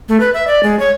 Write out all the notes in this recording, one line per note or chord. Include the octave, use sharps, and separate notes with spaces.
A3
B4
E5
D5
G#3
C#5